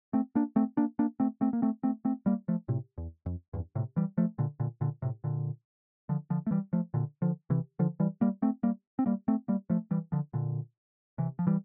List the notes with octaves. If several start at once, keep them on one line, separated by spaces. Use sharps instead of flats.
A3 C4
A#3 D4
A3 C4
A#3 D4
A#3 D4
A3 C4
A3 C4
A#3
A3 C4
A3 C4
A3 C4
G3 A#3
F3 A3
A2 C3
E2
F2
E2 G2
A2 C3
E3 G3
F3 A3
A#2 D3
A#2 D3
A#2 D3
A2 C3
A#2 D3
D3 F3
D3 F3
A3
E3 G3
F3 A3
A#2 D3
D3 F3
C3 E3
D3 F3
E3 G3
G3 A#3
A3 C4
G3 A#3
C4
G3 A#3
A3 C4
G3 A#3
F3 A3
E3 G3
D3 F3
A#2 D3
C3 E3
F3
E3 G3